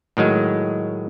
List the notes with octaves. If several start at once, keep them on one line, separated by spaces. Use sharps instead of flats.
A2 D#3 F#3 G#3